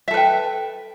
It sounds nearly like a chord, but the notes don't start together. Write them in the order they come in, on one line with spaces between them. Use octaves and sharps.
E5 A4 B4 G5